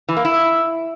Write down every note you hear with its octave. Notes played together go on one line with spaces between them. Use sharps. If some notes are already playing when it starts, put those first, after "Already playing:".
E3
A#3
E4